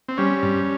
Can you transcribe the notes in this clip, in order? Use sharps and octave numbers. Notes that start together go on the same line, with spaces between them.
C4
G3 C#4
G2